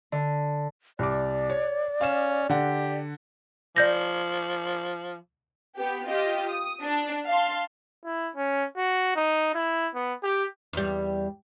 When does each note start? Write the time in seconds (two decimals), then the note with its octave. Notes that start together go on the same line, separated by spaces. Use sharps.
0.12 D3
0.99 C2 D5 D6
1.50 C#5
2.01 C#4 F5 E7
2.49 D3 G4 F#5
3.76 F3 D5 G6 A#6
5.77 B3 G4
6.08 F4 G4 D#5
6.49 D#6
6.82 D4
7.27 F5 A5 C6
8.05 E4
8.35 C#4
8.77 F#4
9.16 D#4
9.55 E4
9.95 B3
10.23 G4
10.73 E2 G3